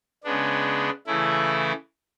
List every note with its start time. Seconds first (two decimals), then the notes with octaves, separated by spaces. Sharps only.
0.24 C#3 G#3 B3 D4
1.07 C#3 E3 A3 E4